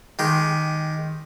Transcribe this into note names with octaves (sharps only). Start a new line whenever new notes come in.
D#3 G#3 G4